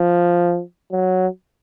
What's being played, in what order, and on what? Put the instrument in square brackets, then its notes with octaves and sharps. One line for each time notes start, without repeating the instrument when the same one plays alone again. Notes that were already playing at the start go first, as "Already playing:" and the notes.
Already playing: [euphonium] F3
F#3